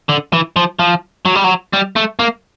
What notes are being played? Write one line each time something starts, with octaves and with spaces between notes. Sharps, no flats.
D3
E3
F3
F3
F#3
G3
F#3
G3
A3
A#3